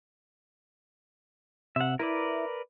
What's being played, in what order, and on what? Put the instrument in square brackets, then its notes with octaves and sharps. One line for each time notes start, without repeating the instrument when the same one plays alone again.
[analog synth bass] C3 [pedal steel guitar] E5 F#5
[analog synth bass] E4 [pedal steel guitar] A#4 B4 D5